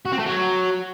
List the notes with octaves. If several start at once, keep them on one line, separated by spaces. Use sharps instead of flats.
F#4
C4
A3
F#3